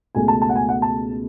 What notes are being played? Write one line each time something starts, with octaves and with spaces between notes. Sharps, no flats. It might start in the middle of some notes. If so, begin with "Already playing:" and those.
C#2 B2 A3 G#5
A5
A5
F#5
G#5
F#5
A5